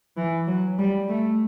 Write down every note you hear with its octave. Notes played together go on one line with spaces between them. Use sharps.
E3
F#3
G3
A3